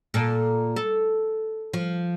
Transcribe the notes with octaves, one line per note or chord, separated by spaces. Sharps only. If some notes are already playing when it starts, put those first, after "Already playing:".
A#2 A4
A4
F3